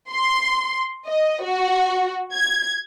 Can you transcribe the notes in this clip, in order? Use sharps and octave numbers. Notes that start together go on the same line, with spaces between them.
C6
D#5
F#4
G#6